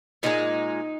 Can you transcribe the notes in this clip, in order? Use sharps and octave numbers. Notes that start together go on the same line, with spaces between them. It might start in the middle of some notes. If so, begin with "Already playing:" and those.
A#2 F3 G#3 D#4